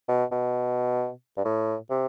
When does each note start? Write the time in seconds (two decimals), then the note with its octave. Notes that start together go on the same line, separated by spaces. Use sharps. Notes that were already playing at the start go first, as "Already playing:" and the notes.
0.08 B2
0.31 B2
1.37 G2
1.45 A2
1.90 C3